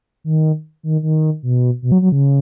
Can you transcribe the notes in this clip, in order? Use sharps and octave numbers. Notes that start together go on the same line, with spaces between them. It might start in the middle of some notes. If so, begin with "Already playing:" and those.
D#3
D#3
D#3
B2
B2
F#3
F#3
C#3